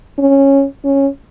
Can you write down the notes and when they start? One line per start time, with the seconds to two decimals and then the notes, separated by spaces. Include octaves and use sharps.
0.19 C#4
0.85 C#4